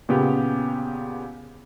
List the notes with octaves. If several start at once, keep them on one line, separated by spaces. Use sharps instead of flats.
A#2 C#3 B3 G4